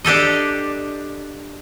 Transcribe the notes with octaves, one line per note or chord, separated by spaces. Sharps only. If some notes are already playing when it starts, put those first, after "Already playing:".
D4 G4 A4 D#5